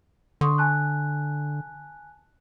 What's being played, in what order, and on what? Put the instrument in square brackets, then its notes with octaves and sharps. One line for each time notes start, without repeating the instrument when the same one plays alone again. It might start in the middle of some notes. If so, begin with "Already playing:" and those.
[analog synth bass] D3 [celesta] C6 C#6 D#6
[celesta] G#5 A5 F#6